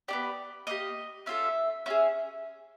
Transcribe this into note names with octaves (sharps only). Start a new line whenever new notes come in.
B3 D4 G4 D5
A#3 D#4 G4 D#5
C#4 F4 A4 E5
C#4 F4 G#4 E5